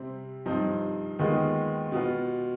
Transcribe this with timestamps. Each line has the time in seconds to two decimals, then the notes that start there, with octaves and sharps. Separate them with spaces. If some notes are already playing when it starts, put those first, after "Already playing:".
Already playing: C3 G3 C4
0.46 G2 F3 C4 D#4
1.19 D#2 D#3 G#3 B3 F4
1.92 B2 B3 F4